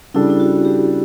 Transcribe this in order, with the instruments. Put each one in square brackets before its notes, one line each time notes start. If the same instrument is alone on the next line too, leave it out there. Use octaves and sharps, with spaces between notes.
[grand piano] C#3 G3 D4 A4 [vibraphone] E4
[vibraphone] E4
F#4
G4